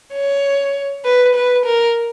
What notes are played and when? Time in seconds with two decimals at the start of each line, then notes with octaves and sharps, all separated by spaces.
0.14 C#5
1.05 B4
1.35 B4
1.66 A#4